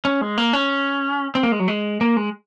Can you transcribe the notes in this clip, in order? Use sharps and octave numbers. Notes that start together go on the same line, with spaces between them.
C#4
G#3
A#3
C#4
C4
A#3
G#3
F#3
G#3
A#3
G#3